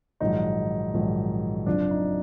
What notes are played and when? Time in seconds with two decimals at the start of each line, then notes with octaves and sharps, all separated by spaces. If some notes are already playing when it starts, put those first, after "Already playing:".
0.20 A#1 G#2 D#3 F#3 D#4
0.94 A#1 G#2 D#3 F#3
1.66 F#1 F2 F3 D4
1.91 D#4